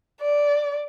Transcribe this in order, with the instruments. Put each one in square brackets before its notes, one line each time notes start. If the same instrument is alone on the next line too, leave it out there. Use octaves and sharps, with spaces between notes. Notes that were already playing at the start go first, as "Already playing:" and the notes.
[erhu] D5